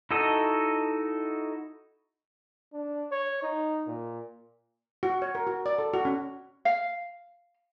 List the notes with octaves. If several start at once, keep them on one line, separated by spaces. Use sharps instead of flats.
D#4 E4 F#4 A4 D#5
D4
C#5
D#4
A#2
F#4
C#5
A#4
F#4
D5
A4
F#4
C#4
F5